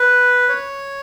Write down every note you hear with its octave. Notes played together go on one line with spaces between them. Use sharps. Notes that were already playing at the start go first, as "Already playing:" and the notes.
Already playing: B4
C#5